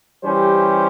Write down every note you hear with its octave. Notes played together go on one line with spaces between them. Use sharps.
E3 G3 C#4 G4 C5